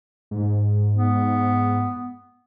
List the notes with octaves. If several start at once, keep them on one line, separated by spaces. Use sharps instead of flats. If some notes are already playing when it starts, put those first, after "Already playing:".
G#2
B3